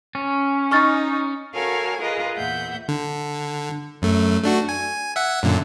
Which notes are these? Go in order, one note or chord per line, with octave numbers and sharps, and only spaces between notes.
C#4
D#4 C#6 F6 A6
F#4 A4 A#4 C#5 F5 G#5
F4 G#4 A#4 B4 D#5
E2 A#2 E5 F#5 G6
D3
F#2 A3
A3 D4 F#4
G#5
E5 F#5
F#2 A#2 D3